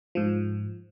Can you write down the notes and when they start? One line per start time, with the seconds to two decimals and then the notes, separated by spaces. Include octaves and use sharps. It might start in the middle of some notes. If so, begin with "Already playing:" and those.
0.15 G#2 F3